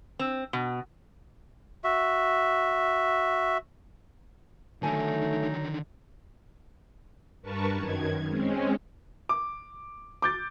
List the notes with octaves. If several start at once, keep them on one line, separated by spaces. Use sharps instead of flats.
C4
B2
F#4 E5
D3 D#3 F#3 A3 D#4 A4 G#5 A5
G2 A#4 B4 A5 C#6
F#2 D#3 G#6
G#3 C4 C#4
D6
D6 G6 A6